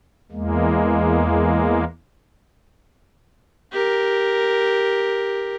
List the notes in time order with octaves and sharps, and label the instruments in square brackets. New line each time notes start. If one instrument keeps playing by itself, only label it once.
[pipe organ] E2 G#3 A#3
[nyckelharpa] G4 A#4